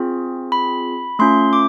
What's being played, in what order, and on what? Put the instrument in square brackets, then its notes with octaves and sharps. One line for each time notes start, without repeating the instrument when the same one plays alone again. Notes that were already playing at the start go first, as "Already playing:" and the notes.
Already playing: [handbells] C4 F4 G#4
B5
A3 C#4 F4 C6
D6